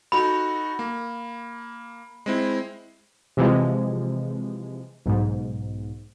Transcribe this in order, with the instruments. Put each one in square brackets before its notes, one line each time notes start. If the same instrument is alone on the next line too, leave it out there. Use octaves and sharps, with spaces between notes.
[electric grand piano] D#4 F#4 A4 [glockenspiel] B5
[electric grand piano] A#3
G#3 C4 E4
[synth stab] C3 E3 F3 G#3
B1 G#2